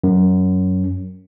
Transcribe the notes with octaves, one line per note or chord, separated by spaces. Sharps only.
F#2